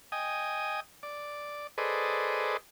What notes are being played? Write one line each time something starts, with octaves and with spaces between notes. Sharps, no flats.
D#5 G5 G#5 D#6
D5
G#4 A4 B4 C5 D5 D#5